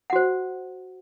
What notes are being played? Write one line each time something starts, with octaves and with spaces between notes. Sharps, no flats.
F#4 C5 F#5